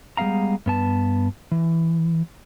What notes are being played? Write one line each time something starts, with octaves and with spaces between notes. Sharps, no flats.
G3 G#3 B3 F5 A#5
G2 B3 A5
E3